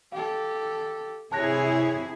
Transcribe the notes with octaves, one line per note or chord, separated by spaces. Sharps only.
G4 A4 F5
C3 E4 G#4 C#5 A5 F#6 A#6